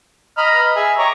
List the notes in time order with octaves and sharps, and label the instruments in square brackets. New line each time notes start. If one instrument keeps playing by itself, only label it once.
[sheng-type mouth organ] D#5 A#5 B5 [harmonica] F6
[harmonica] B4
[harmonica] G#4 [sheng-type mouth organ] E5
[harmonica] G4 A#5 C#6 [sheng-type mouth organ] C#5 D#5